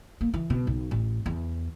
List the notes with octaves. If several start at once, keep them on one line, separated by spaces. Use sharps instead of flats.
A#3
E3
B2
B1
A1
E2